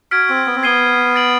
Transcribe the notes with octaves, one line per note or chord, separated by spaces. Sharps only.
F#4 F6 G#6 B6 D7
C4
B3
C4
B3 G#6 C7 D#7 G7
A6 D7 F#7